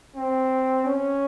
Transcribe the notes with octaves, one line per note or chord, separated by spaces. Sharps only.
C4
C#4